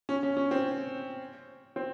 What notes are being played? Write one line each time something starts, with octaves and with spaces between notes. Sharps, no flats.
C#4
C#4
C#4
C4
C4